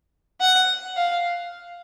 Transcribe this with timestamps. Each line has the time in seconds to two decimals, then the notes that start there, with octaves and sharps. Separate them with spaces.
0.41 F#5
0.97 F5